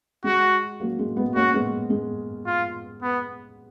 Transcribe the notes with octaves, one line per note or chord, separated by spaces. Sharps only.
G#3 F#4
F#3 A#3
G#3
G#3 B3
A#3 C#4 F#4
G#3 B3
G#3
F4
B3